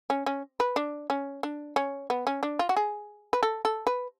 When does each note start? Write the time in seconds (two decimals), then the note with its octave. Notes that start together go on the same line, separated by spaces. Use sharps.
0.10 C#4
0.26 C#4
0.60 B4
0.76 D4
1.10 C#4
1.43 D4
1.76 C#4
2.10 B3
2.27 C#4
2.43 D4
2.59 F4
2.69 F#4
2.77 G#4
3.33 B4
3.43 A4
3.65 A4
3.87 B4